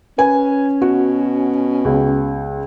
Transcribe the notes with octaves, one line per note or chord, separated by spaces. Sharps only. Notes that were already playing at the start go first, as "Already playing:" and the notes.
C#4 B4 G#5
B2 F#4
C#2